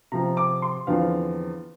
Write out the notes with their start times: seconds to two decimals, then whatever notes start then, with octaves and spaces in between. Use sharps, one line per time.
0.12 C3 F3 C4 A#5
0.37 D6
0.62 C6
0.87 E2 D3 F3 C4 F5